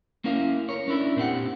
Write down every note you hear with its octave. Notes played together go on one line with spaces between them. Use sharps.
A#3 C#4 E4 A#4 F5
A#4 C#5
C#4 D4 E4 A#4
A#2 C4 G4 F#5